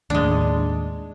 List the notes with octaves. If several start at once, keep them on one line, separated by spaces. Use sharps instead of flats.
D#2 A2 G#3 D4